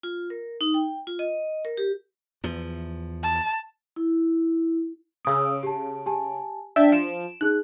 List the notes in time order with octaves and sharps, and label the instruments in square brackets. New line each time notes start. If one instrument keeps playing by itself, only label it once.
[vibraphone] F4
A#4
D#4
G5
F4
D#5
A#4
G4
[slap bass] E2 F3
[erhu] A5
[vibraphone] E4
[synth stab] C#3 D7 [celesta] D#6 E6
[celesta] G4 A5
G4 G#5 A5
[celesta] D4 D5 [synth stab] E5 G5 A5
[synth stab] F3 [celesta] D7 E7
[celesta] D#4 G#4 [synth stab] F#6